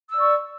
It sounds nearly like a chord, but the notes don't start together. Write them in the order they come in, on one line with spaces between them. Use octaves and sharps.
E6 D5 C#6